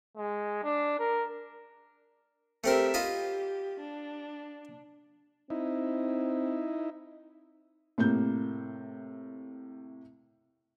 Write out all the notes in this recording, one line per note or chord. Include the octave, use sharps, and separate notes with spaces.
G#3
D4
A#4
A3 C4 G4 A#4 E5
F4 G4 D#5 B5
D4
C4 D#4 E4
A2 C3 A#3 G6